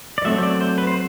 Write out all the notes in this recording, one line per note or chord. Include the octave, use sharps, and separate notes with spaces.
D5
F#3 A3 C4 E5
C5
D5
C5
B4
C5